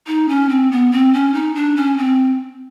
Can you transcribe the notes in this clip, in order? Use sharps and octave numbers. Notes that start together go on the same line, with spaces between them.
D#4
C#4
C4
B3
C4
C#4
D#4
D4
C#4
C4